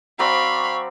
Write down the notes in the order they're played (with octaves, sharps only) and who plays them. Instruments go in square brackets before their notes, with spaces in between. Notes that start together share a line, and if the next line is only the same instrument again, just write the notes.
[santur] F#3 C4 D5 [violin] F5 B5 [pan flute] C#6